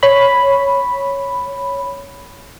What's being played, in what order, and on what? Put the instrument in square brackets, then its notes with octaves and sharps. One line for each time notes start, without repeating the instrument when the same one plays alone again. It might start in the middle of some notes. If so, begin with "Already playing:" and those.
[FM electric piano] C#5 B5